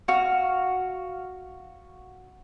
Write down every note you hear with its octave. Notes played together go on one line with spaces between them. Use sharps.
F#4 F5